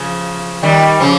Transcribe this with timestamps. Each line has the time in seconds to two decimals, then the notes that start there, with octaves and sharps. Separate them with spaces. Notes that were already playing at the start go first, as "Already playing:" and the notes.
Already playing: C#3 F3
0.63 D#3 G3
1.00 C#3 F3